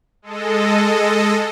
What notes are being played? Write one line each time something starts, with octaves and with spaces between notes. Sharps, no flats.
G#3 A4 D#5